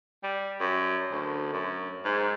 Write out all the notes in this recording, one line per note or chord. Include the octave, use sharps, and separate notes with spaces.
G3
F#2
D2
F#2
G#2